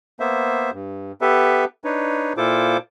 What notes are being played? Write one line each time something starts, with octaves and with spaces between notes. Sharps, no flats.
A#3 B3 C5 E5
G2
B3 G4 A4 B4 E5
D4 D#4 B4 C#5
A#2 E4 F4 A4 C5 D6